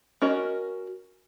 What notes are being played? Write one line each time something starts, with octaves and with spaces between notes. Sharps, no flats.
C#4 F#4 A#4 D#5